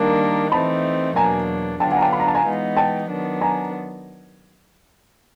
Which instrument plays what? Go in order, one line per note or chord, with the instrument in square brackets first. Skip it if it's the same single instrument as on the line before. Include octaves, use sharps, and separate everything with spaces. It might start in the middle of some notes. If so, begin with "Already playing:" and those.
Already playing: [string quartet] D#3 G3 A#3 D4
[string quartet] E3 A3 C4 D#4 [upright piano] A5 B5
[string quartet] E2 B2 F#3 A#3 D4 [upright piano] G#5 A#5
[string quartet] D3 F#3 B3 D4 F4 [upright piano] G5 A5
[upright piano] F#5 G#5
A#5
G5 A5
B5
A#5
A5
G#5 A#5
[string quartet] E3 G#3 B3 D#4
[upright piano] G5 A5
[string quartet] D#3 F#3 B3 D4
[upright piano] G#5 A#5